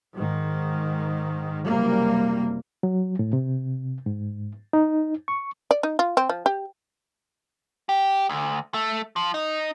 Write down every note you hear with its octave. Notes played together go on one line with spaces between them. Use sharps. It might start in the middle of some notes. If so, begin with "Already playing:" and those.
G#2 D#3
F#1 C3 G3 A#3
F#3
A2
C3
G#2
D#4
C#6
D5
D#4
F4
C4
F3
G4
G4
D2
A3
F3
D#4